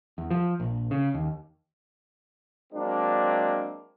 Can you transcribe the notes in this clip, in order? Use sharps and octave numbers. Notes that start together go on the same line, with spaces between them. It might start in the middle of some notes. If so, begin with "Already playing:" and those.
E2
F3
A#1
C#3
D#2
F#3 G#3 A#3 C4 D4